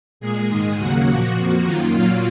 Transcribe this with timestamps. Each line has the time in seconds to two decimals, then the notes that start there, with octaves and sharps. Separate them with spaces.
0.20 A#2 G#3 G#4
0.49 G#2 D#3 G#3 G#4
0.78 D#2 C#3 F#3 A#3 F#4
1.07 A#2 F3 A#3
1.36 F2 F3 A#3
1.65 F#2 D#3 A#3 F4
1.95 A#2 F#3 A#3